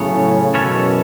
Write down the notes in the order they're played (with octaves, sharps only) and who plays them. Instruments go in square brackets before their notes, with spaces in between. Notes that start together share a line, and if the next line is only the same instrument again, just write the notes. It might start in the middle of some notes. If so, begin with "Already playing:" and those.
Already playing: [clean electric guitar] F#2 F#3 B3 A4 C#5 [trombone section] A2 C#3
[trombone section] F#2 B2 [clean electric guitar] E3 C#4 A4 C#5